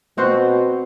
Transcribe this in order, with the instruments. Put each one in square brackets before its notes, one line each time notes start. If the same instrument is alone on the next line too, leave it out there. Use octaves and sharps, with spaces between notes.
[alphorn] B2 [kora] C4 F#4 C5